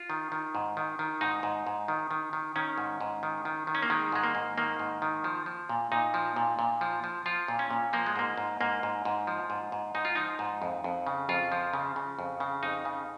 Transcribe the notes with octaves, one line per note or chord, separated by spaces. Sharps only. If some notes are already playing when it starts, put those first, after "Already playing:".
Already playing: F4
D#3
D#3
G#2
D#3
D#3
G#2 D#4
G#2
G#2
D#3
D#3
D#3
D#3 C#4
G#2
G#2
D#3
D#3
D#3
C#4
A#3
D#3 G#3
G#2 G#3
A#3
G#2
D#3 A#3
G#2
D#3
F3
F3
A#2
A#2 D#4
F3
A#2
A#2
F3
F3
F3 F4
A#2
C#4
A#2
F3 A#3
G#3
G#2 A#3
G#2
G#2 A#3
G#2
G#2
F3
G#2
G#2
G#2 D#4
F4
F3 D#4
G#2
F2
F2
C#3
F2 F4
F3
C#3
C#3
F2
C#3
F2 D#4
C#3